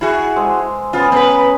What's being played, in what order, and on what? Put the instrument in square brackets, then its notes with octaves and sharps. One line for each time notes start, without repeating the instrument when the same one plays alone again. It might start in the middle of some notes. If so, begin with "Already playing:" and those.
[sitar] E4 F#4 G#4
[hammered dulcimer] G#3 A4 C5
[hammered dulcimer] C#3 B3 G#4 [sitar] F4
[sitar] B3 B4 [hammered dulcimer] A#5